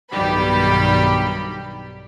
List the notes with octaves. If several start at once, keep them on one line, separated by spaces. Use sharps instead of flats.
B1 G2 D#3 G3 G4 B5